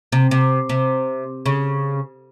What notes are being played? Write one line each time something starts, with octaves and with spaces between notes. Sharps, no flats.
C3
C3
C3
C#3